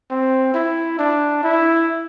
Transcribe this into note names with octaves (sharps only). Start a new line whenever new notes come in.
C4
E4
D4
E4